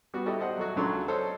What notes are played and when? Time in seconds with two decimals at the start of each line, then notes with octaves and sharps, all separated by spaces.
0.14 G3 B3 F#4
0.26 E4 G4 A4 D5 D#5
0.40 C5 D#5 F#5
0.58 F#3 A3 F#4
0.76 C#2 C#3 F#3 D4 A4 C6
1.08 A4 C5 C#5 D#5